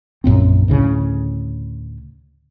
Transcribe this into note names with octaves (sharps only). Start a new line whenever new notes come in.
A#1 F#2 A#2 C4
D2 A2 C#3